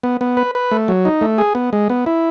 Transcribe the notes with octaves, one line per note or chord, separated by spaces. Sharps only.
B3
B3
B4
B4
A3
F#3
D#4
A3
G#4
B3
G#3
B3
E4